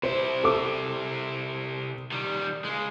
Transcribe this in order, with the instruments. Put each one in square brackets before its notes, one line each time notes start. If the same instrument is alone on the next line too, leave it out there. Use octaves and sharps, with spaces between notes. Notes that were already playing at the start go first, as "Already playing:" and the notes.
[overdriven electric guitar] C3 E4 [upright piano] C5
[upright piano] A4 D6
[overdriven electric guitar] D#3 G3
C#3 G#3